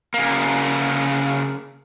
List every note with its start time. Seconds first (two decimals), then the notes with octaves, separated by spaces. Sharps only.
0.14 C#3 A#3